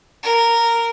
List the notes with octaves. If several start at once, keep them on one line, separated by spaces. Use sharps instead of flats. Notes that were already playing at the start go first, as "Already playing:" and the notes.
A#4